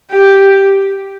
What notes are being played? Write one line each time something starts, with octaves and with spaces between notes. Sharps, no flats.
G4